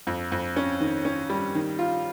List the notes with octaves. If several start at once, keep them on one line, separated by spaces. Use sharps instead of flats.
F2
F2
C#4
D#3
C#4
G3
D#3
F4